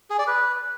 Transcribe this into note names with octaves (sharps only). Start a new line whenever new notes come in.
G#4
D5
B4